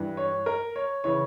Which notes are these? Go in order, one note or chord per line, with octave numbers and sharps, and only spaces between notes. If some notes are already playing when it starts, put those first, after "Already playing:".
Already playing: G2 E3
C#5
A#4
C#5
C#3 E3 C#5